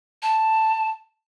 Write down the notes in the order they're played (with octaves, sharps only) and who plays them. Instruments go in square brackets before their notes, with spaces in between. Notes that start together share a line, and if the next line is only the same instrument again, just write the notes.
[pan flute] A5